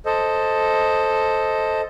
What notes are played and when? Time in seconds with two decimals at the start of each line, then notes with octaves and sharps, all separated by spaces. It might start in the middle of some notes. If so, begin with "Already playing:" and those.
0.06 A4 C5 D#5